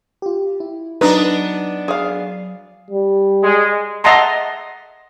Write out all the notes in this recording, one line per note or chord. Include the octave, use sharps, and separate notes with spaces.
F4 G4
E4
F#3 B3 D4 D#4 B4
G#4 F5
G3
G#3
D#5 E5 F#5 A5 A#5 C6